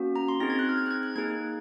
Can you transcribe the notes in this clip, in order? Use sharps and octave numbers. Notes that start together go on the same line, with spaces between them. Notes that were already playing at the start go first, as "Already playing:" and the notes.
Already playing: A#3 C#4 F#4
A#5
C6
C4 D#4 G#4 A#6
G#6
F#6
F6
G#6
F#6
G#6
F#6
A#3 D#4 G#4 G#6